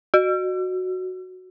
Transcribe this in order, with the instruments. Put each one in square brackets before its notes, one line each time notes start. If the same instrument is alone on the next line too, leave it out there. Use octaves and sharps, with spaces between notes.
[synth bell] F#4